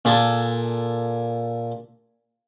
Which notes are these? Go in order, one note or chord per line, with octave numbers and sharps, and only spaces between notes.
A#2 G#4 A4 G#5